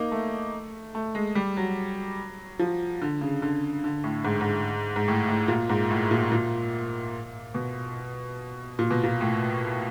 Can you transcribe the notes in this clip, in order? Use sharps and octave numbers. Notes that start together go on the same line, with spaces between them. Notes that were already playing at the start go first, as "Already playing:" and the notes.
Already playing: A#3 D#4
A3
A3
G#3
G3
F#3
F3
D3
C#3
D3
D3
A2
G#2
G#2
G#2
A2
A2
A#2
G#2
A2
A#2
A#2
B2
A#2
B2
A#2
A2